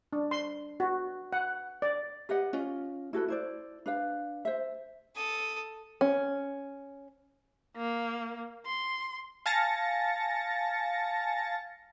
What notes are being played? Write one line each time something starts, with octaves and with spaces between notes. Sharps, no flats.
D4
C6
F#4
F#5
D5
G4 B4 D#5 F#5
C#4 F4 D#5
E4 F#4 A4 B4
E4 C5 D5
D4 B4 F5
C5 E5
A4 D#6
C#4
A#3
C6
F5 G#5 A5 A6 A#6 C#7